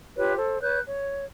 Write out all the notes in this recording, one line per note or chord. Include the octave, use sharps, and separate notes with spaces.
F4 G4 B4 C#5
A4 C5
B4 C#5 F#6 G6
C#5